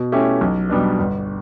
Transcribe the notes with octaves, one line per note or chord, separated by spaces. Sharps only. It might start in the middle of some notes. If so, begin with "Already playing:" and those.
Already playing: B2
A3 C#4 E4 G4
B1
B2 G3 B3 D4
G1